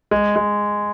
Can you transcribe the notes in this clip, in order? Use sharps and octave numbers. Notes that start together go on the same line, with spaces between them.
G#3
G#3